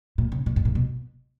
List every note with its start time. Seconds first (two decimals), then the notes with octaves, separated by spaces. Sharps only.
0.18 A#2
0.32 C#3
0.46 A#2
0.56 G#2
0.65 A#2
0.75 B2